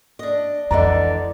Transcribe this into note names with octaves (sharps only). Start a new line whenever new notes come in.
D4 D#5
F2 D3 E3 G#3 D5 D#5 A#5